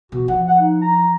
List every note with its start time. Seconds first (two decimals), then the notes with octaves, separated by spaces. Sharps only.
0.12 B2 F#4
0.28 F3 F#5
0.48 F#5
0.60 D#4
0.81 A#5